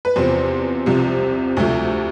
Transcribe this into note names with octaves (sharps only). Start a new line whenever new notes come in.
B4
E2 C3 F3 C4 C5
C2 C3 F3
D2 C3 F3 A3